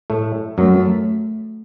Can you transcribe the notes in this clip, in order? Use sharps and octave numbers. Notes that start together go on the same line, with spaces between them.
A2 A3
F#2 F#3 A3